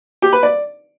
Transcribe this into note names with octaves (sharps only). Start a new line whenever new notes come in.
G4
B4
D5